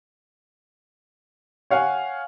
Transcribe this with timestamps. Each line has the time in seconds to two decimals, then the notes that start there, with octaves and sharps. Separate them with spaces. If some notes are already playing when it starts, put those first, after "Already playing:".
1.70 C#5 F5 F#5 G#5